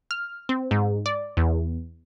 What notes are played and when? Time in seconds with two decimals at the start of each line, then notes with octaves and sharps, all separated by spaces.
0.11 F6
0.49 C4
0.71 G#2
1.06 D5
1.37 E2